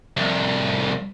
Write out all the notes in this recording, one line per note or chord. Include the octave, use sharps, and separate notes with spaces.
C2 F2